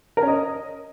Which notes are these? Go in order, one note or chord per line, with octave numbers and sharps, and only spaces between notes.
A#4
C#4
D#5